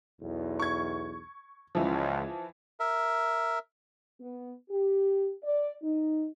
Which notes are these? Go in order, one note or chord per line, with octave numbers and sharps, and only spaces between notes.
B1 E2
C#6 G#6
C#2 E3 F3
A#4 E5
B3
G4
D5
D#4